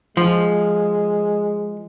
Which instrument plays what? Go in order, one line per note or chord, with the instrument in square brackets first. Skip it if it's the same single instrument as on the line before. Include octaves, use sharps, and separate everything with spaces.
[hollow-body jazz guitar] F3 [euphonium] G#3